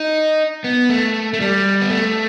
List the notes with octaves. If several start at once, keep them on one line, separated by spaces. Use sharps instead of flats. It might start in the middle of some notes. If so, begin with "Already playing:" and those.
Already playing: D#4
B3
A3
A3
G3
B3
A3